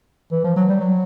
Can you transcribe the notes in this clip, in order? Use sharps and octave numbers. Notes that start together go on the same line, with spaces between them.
E3
F3
F#3
G3
F#3